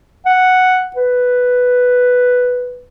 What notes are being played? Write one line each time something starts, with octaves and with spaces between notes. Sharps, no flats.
F#5
B4